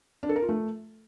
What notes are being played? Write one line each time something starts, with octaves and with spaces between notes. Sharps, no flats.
D4
A4
A#4
F4
A3